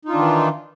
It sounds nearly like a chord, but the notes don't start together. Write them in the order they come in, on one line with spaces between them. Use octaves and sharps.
D#4 F4 D4 D#3 E3